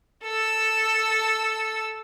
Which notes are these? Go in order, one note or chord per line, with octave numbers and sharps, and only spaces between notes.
A4 E6